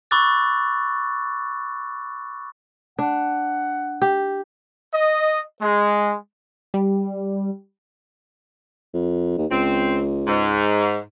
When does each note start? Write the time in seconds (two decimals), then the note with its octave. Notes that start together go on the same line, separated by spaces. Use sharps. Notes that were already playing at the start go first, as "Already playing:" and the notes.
0.11 B5 C#6 D6 E6 F#6 A6
2.99 D4 F#5
4.02 G4
4.93 D#5
5.60 G#3
6.74 G3
8.94 F2
9.38 D#2
9.51 C#2 C4
10.28 G#2